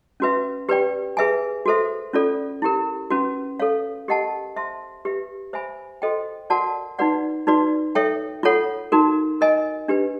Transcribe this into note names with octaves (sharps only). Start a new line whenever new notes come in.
C#4 F#4 B4 E5
G4 B4 D5 G5
G#4 B4 E5 G#5
F#4 A4 C5 E5
C#4 F4 A4 D5
E4 G4 A#4
C#4 F#4 B4
A4 C#5 F5
G4 A#4 D#5 F#5 A5
C5 E5 A5 C6
G4 B4 E5
C5 E5 G#5 B5
F#4 A4 C5 D#5 G5
F#4 A#4 D5 F#5 A5
D#4 F#4 B4 D5 F#5
D#4 F#4 B4 D5
A4 C#5 E5 G5
F4 A4 C#5 F#5
D#4 F#4 A#4
A#4 D#5 G#5
D4 G4 B4